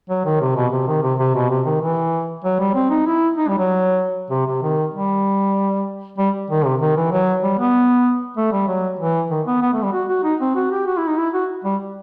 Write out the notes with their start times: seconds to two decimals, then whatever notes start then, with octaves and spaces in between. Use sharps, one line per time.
0.10 F#3
0.25 D#3
0.41 C3
0.56 B2
0.72 C3
0.88 D#3
1.03 C3
1.19 C3
1.35 B2
1.50 C3
1.66 D#3
1.81 E3
2.44 F#3
2.59 G3
2.75 C4
2.90 D#4
3.06 E4
3.38 D#4
3.48 G3
3.58 F#3
4.30 C3
4.46 C3
4.62 D#3
4.94 G3
6.18 G3
6.50 D#3
6.65 C3
6.81 D#3
6.96 E3
7.12 F#3
7.43 G3
7.58 B3
8.37 A3
8.52 G3
8.68 F#3
8.99 E3
9.30 D#3
9.47 B3
9.62 B3
9.73 A3
9.82 G3
9.93 F#4
10.09 F#4
10.24 D#4
10.40 C4
10.56 F#4
10.71 G4
10.87 F#4
10.97 E4
11.07 D#4
11.17 E4
11.33 F#4
11.64 G3